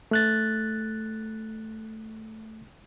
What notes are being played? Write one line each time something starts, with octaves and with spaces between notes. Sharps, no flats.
A3 F#6 A6